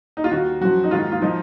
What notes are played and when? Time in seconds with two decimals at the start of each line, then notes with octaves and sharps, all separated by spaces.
0.17 D#4
0.24 F4
0.31 D#2 D#3 F#4
0.61 F#2 F3 F#4
0.84 D#4
0.91 G#2 D#3 F4
1.12 F4
1.22 F3 D#4